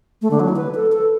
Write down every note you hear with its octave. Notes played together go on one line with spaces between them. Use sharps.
A3
D3
F#3
E4
B4
A4
A4